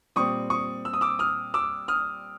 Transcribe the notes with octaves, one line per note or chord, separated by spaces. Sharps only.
A#2 G3 C4 C#6 D#6
C#6 D#6
E6
D#6
D6 E6
D#6 F6
D6 E6
D#6 F6